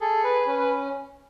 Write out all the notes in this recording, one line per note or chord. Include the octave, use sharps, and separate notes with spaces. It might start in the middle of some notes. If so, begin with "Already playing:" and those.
G#4 A4
B4
C#4 B4
B4